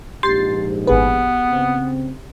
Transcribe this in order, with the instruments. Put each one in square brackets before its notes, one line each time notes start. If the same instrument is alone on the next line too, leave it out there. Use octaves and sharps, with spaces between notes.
[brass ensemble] A#1 G#2 [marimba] G4 [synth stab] C6 A6 C7
[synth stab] G#1 G#4 B4 [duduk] B3
[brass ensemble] C#3 C4